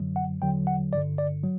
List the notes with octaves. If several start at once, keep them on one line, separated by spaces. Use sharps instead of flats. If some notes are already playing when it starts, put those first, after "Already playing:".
Already playing: F#2 D3 F#3
F#5
E2 D3 F#3 G5
F#5
G1 G2 D3 D5
D5
F#3